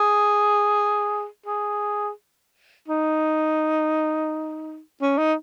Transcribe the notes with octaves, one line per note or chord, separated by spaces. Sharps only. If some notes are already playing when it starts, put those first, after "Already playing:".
Already playing: G#4
G#4
D#4
C#4
D#4